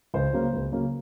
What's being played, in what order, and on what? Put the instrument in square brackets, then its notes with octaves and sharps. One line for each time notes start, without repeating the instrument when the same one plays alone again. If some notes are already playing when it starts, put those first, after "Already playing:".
[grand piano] C#2 C5
C#3 F#3 A#3
C#2
C#3 F#3 A#3